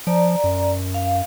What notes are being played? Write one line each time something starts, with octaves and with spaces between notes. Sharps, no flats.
F3 D5 A#5
F#2
F5